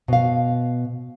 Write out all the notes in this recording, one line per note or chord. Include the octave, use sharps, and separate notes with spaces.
B2 F5